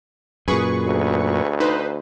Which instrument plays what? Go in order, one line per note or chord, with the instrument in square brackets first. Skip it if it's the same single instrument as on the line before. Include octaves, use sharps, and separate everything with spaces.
[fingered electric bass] F#2 A#2 [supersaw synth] G#4 B4 C#6
[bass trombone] D2
[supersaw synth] D#4 B4 C5